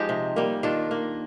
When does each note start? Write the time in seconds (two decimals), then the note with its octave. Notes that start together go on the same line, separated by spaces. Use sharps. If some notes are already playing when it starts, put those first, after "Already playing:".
Already playing: F3 G#3 D#4 G4
0.09 C3
0.36 G3 A#3
0.63 D#3 D4 F4
0.91 A#3